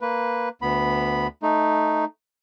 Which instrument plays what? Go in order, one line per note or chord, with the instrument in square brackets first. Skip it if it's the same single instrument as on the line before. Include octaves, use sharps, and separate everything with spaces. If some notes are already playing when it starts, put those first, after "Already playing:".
[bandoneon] A#3 B4
D2 B3 B5
A3 D#4